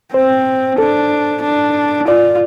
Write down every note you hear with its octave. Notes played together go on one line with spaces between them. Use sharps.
C4 C5
D4 A4
D4
F4 D5